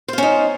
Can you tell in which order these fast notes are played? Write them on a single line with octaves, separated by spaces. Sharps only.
C5 F4 C#4 D#4